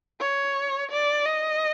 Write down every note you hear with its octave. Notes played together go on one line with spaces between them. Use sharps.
C#5
D5
D#5